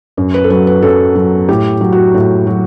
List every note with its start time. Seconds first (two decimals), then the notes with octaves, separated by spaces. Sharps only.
0.17 F#2
0.34 B4
0.44 A4
0.50 F#3 B4
0.67 B4
0.82 F#2 A4
1.15 F#3
1.49 A2 G4
1.81 F#3
1.92 F#4
2.14 A2
2.47 F#3